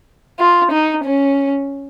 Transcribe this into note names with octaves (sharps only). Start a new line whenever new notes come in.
F4
D#4
C#4